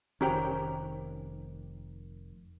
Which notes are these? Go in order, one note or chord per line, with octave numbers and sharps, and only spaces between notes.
F1 D#3 C#4 G4 C5 G5 A#5